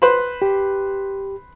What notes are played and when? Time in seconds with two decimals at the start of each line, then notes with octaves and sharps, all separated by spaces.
0.02 B4 C5 B5
0.42 G4